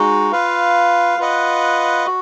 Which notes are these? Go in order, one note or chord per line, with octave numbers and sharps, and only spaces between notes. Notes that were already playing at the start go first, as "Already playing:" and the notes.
Already playing: G#3 D#4 F#4
F4 B4 F5
F4 B4 D#5 F#5
F#4